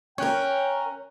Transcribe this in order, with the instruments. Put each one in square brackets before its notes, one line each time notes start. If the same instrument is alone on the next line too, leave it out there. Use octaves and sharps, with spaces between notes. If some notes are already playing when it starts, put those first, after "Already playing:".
[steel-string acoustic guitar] C#4 A#4 [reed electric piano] C#5 F#6 [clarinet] G5